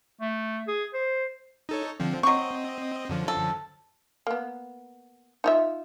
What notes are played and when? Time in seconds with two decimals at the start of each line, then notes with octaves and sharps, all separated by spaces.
0.21 A3
0.68 G#4
0.94 C5
1.69 D#4 A4 C#5
2.00 D3 F3 C4
2.23 F#3 C4 D#5 C#6
3.09 F#2 D3 F3
3.28 A4
4.27 A#3 B3
5.44 D#4 F4 E5